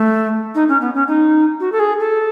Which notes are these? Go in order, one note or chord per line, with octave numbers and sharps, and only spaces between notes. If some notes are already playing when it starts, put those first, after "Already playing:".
Already playing: A3
D#4
C#4
B3
C#4
D#4
F#4
A4
G#4
A4